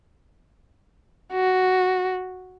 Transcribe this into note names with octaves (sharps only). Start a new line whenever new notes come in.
F#4